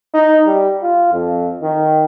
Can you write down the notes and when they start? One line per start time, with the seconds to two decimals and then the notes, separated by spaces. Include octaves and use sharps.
0.14 D#4
0.46 G3
0.82 F4
1.13 F2
1.62 D#3